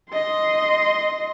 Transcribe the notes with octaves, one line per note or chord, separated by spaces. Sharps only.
D#5 C6